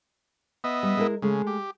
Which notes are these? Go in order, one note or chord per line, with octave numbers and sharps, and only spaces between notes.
B3 D#5 E5
G3
G#3 E4 A#4
C#3 G#3 A3
G4